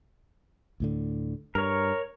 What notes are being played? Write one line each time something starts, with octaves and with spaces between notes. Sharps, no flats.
D2 A2 D3
G2 A#4 C#5